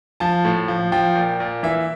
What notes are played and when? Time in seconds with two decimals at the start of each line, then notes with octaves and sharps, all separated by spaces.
0.20 F3 A5
0.45 A2
0.68 F3
0.92 F3 G5
1.16 A#2
1.40 A#2
1.63 E3 E5